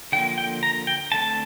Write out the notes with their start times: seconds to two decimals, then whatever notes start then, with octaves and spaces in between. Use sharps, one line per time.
0.12 D3 F3 A#3 G5
0.38 G5
0.63 A#5
0.87 G5
1.12 D3 A3 C4 A5